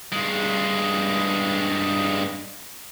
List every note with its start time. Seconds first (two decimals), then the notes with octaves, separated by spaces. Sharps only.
0.12 G2 G#3